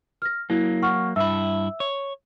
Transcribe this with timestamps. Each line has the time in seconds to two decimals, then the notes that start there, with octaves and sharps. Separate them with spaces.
0.22 F6 A#6
0.50 F#3 A#3 E4
0.83 F#5 C#6 F6
1.16 G2 E4 E5 E6
1.80 C#5